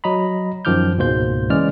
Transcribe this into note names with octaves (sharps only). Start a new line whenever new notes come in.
F#3 D#5 A#5 B5
F#2 D#3 F3 D6 F6 G6
C#2 G#2 B2 A#3 C5 G6
C#3 E3 G#3 C#4 D5 F6